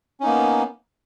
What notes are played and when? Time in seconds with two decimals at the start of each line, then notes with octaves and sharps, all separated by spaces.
0.20 C#4
0.23 D#4
0.26 A#3
0.28 B3